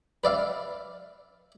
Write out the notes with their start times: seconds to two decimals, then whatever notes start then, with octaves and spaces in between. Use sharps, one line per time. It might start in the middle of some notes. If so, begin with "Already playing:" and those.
0.24 B4 D5 E5 F5